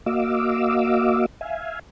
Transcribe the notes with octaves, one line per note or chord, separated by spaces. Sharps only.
A#3 F#4 D#5 F5 D6 E6
E5 F5 G#5